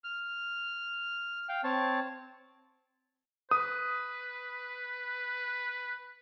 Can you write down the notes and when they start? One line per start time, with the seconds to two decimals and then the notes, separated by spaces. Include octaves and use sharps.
0.04 F6
1.49 F5 G5
1.64 C4 C#5 A5
3.51 B4 D#6